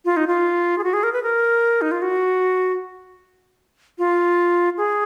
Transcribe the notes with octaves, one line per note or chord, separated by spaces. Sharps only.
F4
D#4
F4
G#4
F#4
G#4
A#4
B4
A#4
D#4
F4
F#4
F4
G#4